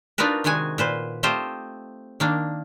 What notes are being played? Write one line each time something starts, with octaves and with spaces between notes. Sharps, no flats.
D4 D#4 F4 F#4 A#4 B4
C3 D#3 G#3 F#4 G#5
A#2 B4 C5
A3 C4 F4 G4 C5 D#5
D#3 A#3 D4